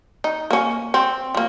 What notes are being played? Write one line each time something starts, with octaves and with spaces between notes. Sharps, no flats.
D#4
A#3 C#4
C4
F3 A#3